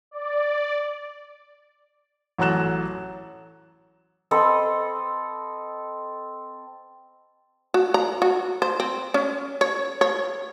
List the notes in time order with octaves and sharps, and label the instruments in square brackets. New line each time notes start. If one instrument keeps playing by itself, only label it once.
[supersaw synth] D5
[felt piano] A1 F#3 A4 A#5 F#6 E7
[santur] C4 A4 D#5 B5
[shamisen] F#4
A#5
F#4
C5
C4
C#4
C#5
C#5